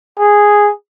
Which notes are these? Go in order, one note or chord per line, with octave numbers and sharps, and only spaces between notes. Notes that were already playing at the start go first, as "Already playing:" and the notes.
G#4